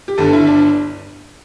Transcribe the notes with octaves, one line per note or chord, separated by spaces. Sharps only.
G4
G1 G2 D3 A4
E4
D4